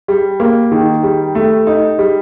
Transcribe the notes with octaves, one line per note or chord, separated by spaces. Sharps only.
G3
A#3
D#3
G3
A3
D#4
G3